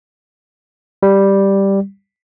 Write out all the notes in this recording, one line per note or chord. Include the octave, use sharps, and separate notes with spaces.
G3